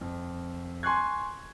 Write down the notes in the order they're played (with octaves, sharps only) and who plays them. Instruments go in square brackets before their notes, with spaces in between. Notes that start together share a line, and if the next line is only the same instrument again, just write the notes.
[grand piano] F2
G#5 C6 C#6 F#6 G#6